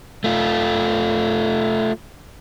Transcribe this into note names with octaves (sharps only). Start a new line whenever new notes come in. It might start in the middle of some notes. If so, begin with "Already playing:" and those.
A3 F4